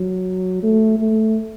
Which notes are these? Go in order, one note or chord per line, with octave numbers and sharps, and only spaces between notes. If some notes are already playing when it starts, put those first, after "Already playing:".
Already playing: F#3
A3
A3